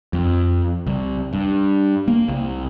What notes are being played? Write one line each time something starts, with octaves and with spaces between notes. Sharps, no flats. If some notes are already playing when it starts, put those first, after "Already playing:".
F2
C2
G2
A#3
C2